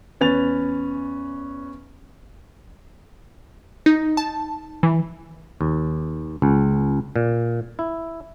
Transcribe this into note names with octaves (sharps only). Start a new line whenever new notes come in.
E2 C#4 B4 A6 F7
D#4
A5
E3
D#2
C#2
A#2
E4